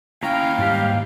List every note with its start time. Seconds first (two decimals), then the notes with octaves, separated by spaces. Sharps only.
0.23 D#2 C#4 E4 F5 G5 A#5
0.58 G#2 G3 G4